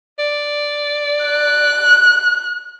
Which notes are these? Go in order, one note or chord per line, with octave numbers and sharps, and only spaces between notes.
D5
F#6